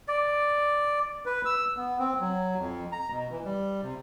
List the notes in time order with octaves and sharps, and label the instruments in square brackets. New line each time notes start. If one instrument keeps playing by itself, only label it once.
[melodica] D5
[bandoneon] B4
E6
B3
C4
F#3
F2
A#5
B2
E3
G3
C3